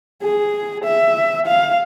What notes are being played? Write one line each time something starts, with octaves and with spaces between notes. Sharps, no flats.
G#4
E5
F5